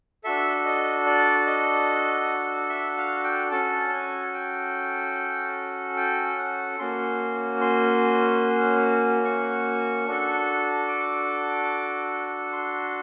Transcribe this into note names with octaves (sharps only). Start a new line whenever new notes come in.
D4 F#4 A4 E5
D#5
D5
D#5
E5
F5
G5
C#4 F#4 A4 A5
A5
G#5
G5
G5
F#5
A#3 C#4 F#4 C6
C6
C#6
D4 F#4 A4
D6
C6